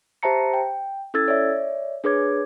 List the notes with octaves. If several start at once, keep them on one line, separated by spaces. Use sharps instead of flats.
G4 C5 E5 A5 A#5 C#7
G5
C#4 E4 A4 E6 G#6 A6
C#5 D5 E5
D4 G#4 B4 C#5 D6 G#6